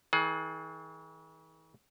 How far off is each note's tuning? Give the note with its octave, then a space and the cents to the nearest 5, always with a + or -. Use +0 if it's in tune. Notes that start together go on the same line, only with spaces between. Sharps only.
E3 -45 G#4 +30